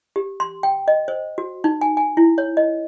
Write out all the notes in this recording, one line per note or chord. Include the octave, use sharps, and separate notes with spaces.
G4
C6
G5
D#5
C5
F#4
D#4
G#5
G#5
E4
C#5
D#5